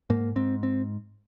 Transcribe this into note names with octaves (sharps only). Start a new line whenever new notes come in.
G#2 A#3
G#2 C4
C4